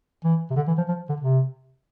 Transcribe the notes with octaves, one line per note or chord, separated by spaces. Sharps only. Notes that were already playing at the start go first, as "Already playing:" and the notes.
E3
C3
D3
E3
F3
F3
D3
C3